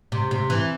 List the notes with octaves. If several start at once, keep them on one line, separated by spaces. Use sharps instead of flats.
C3
C3
E3